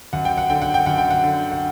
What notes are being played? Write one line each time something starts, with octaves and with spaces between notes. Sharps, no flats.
F#2 F#5
G5
F#5
D3 G5
F#5
G5
F#2 F#5
G5
F#5
D3
F#5